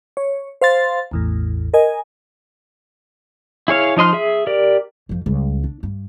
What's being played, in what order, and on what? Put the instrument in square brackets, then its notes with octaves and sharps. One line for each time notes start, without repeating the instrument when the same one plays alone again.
[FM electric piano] C#5
C5 F5 C6 A6
A1 E2 A2
A#4 D#5 G#5
[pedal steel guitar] E4 G#4 C#5 F5
F3 D#4 D#5 C6 F6
G#4 E5
G4 A#4 D5
[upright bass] F2 F3
C#2 G3
D4
G2